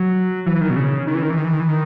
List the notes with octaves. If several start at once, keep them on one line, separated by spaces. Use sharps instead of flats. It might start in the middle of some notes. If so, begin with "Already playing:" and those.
Already playing: F#3
E3
D#3
B2
C#3
D#3
E3
D#3
E3
D#3
E3
D#3
E3
D#3